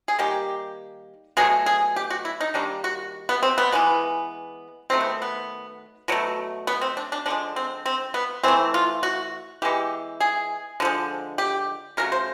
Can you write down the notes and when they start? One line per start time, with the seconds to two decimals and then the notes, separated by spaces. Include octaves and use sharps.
0.08 G#4
0.19 D#3 G3 A#3 G4
1.37 B2 F#3 A3 G#4
1.66 G#4
1.96 G4
2.10 F#4
2.25 E4
2.41 D#4
2.54 D#3 G3 A#3 D4
2.84 F#4
3.29 B3
3.43 C4
3.58 B3
3.72 E3 G#3 B3
4.90 D#3 F#3 A3 C4
5.01 B3
5.22 B3
6.08 B2 F#3 A3
6.67 B3
6.81 C4
6.97 D4
7.12 D4
7.26 D3 F3 G#3 D4
7.56 C4
7.86 C4
8.14 B3
8.44 E3 A3 C4
8.74 F4
9.03 F#4
9.62 E3 G#3 B3 G4
10.20 G#4
10.80 D3 F3 G#3
11.38 G4
11.97 C#3 F#3 A3 A#4
12.12 C5